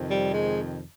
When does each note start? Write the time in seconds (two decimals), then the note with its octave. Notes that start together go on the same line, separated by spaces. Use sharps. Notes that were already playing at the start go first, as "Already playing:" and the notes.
Already playing: F2 C3 D#3
0.09 G3
0.33 G#3